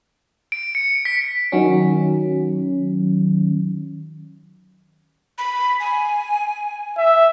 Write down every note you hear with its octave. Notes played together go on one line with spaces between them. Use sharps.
D7
C#7
B6
D#3 F#3 C#4
B5
G#5
E5